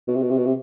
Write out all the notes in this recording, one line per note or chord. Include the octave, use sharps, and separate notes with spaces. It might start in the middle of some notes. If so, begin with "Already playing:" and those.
B2
C3
B2
C3
B2
C3